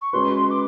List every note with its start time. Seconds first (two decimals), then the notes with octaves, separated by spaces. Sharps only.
0.02 C#6
0.13 G#3 C#4 F#4 B4 C6
0.50 D6